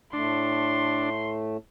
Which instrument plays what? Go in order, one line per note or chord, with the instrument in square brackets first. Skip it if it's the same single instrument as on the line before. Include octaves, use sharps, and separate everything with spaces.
[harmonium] A2 A3 [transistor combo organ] D4 [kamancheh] C6